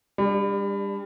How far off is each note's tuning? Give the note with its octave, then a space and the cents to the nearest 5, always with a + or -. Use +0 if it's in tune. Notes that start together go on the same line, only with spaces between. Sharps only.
G3 +30 D4 +0